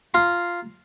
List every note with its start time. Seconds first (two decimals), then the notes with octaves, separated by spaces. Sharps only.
0.14 F4 A#5 C6